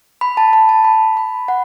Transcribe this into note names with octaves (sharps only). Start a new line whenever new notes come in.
B5
A5
A5
A5
B5
B5
F#5